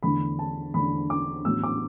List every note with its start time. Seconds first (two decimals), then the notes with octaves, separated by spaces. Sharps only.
0.03 E2 D3 A3 D4 B5
0.39 A5
0.74 E2 D3 A3 D4 B5
1.10 D6
1.45 A1 A2 F#3 B3 E6
1.63 D6